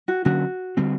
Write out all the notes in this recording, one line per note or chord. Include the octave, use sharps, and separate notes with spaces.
F#4
D3 F#3 A#3 C#4 F#4
D3 G3 C4